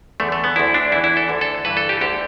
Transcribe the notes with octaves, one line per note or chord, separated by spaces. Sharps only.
E2 D3 A3
A3
B3
D2 D3 E4
D4
E2 E3 E4
E4
A4
D2 D3
A4
G2 E3 B4
A4
G4
D2 D3 G4